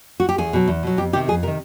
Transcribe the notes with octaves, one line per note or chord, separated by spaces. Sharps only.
F#4
G4
E2 G#4
B2 F#3
E2
B2 F#3
F2 G4
C3 D#3 G4
F2 G#4
C3 D#3 A#4